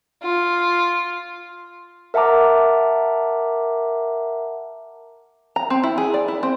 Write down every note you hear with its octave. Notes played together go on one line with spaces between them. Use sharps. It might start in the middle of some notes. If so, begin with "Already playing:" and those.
F4
A#4 E5 F#5 A5 A#5 D6
A#5
C4
E4
G#4
D5
E4
C4